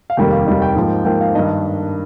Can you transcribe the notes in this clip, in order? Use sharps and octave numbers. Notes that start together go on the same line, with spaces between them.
F5
F1 D#2 D#3 G3 A#3 G5
F5
F1 D#2 D#3 G3 A#3 D#5
G5
G#2 F3 A#3
G#2 F3 A#3 G5
F5
G2 D#3 A#3 D4 D#5